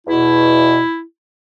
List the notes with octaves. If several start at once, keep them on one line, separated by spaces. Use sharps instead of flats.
E2 B2 E4